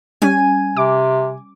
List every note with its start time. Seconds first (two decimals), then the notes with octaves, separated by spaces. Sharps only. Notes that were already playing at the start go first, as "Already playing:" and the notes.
0.22 G3 C#4 G#5
0.77 C3 D6